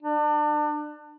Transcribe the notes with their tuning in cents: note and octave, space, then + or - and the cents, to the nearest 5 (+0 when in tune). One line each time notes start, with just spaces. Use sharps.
D4 +30